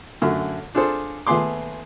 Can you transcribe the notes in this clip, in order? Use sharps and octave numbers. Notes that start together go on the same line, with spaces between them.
F#2 D3 A3
D4 F4 G#4 A4 C5
D#2 A3 B3 G#4 C6 D6